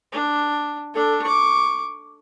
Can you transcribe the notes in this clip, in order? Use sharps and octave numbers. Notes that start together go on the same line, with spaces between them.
D4
D4 A4
C#6 D6